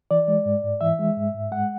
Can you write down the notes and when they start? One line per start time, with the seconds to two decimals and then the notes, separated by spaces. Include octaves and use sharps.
0.11 E3 D5
0.28 G#3
0.46 G#2
0.63 G#2
0.81 E3 E5
0.99 G#3
1.17 G#2
1.34 G#2
1.52 G#3 F#5